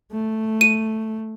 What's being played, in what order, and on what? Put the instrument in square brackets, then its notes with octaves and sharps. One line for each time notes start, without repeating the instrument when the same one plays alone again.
[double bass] A3
[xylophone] D#7